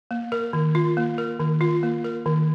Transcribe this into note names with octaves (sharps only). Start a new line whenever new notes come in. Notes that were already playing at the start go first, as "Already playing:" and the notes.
A#3
A#4
D#3
F4
A#3
A#4
D#3
F4
A#3
A#4
D#3